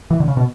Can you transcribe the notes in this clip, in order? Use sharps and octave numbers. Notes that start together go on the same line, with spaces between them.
E3
D3
C#3
B2